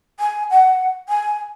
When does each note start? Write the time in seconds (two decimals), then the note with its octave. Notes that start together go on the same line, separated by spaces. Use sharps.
0.20 G#5
0.50 F#5
1.09 G#5